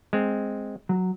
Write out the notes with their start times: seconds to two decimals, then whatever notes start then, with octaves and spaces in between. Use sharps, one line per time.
0.13 G#3 C4
0.89 F#3